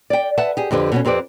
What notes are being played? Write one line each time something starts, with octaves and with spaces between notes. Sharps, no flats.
D5 G5
B4 E5 F#5 A5
G4 G#4
F2 D3 G4 B4
B2 B3 C#4
F2 C4 G4 B4 D5